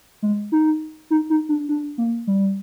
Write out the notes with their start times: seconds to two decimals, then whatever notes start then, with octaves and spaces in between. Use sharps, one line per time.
0.22 G#3
0.52 D#4
1.11 D#4
1.30 D#4
1.49 D4
1.69 D4
1.98 A#3
2.27 G3